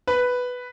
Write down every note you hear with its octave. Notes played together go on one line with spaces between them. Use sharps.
B4